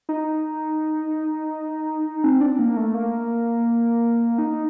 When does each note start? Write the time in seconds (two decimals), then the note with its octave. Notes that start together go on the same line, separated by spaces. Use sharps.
0.09 D#4
2.24 C4
2.41 D4
2.59 A#3
2.77 A3
2.94 A#3
4.38 D#4